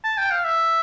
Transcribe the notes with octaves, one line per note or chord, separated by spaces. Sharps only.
A5
G5
F5
E5